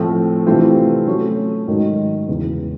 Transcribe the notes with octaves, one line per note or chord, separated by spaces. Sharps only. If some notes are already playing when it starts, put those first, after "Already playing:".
Already playing: A2 F3 A3 C4
C3 E3 A3 C4 F4
F#3 A3 C#4
G#2 D#3 F#3
E2 C#3 E3